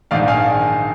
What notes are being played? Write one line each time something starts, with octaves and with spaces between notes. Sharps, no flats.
A#1 G#2 D#3 D5 F5
F5 G#5